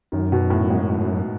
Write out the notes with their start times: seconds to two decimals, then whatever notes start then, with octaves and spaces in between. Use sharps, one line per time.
0.12 F#2 D#3
0.32 B2
0.50 A2
0.70 G#2
0.89 A2